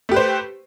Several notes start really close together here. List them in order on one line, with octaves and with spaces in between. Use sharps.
A3 G4 B4 C5